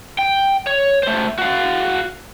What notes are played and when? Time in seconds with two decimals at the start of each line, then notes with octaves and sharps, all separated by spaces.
0.19 G5
0.67 C#5
1.03 A3 C5
1.38 F#4 F5